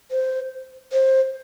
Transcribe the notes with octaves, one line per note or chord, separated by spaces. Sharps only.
C5
C5